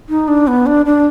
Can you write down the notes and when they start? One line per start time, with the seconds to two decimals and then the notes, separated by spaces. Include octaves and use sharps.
0.09 D#4
0.28 D4
0.47 B3
0.66 D4
0.85 D4